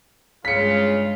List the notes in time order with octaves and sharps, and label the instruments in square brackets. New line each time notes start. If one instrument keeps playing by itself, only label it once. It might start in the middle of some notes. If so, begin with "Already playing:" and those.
[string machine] G2 G#3 [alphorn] C#3 [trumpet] F4 [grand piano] B6 C#7